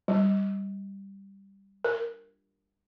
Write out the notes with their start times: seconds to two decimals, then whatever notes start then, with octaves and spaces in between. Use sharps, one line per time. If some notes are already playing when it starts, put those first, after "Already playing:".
0.08 G3
1.85 A#4